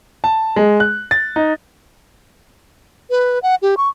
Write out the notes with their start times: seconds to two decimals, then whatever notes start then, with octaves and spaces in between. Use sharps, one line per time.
0.24 A5
0.56 G#3
0.80 F#6
1.11 A6
1.36 D#4
3.10 B4
3.43 F#5
3.62 G4
3.77 C#6